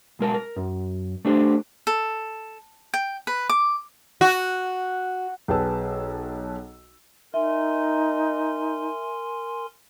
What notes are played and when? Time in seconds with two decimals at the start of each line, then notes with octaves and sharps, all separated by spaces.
0.19 B1 G#3 A#4 A5
0.34 A#4
0.56 F#2
1.25 A3 D4 G4 C5
1.87 A4
2.94 G5
3.27 B4
3.49 D6
4.21 F#4
5.48 B1 G#4 B4 G5 A5 E6
7.34 D#4 A#4 E5 G#5 C6